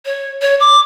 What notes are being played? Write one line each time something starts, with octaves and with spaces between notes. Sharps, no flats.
C#5
C#5
D6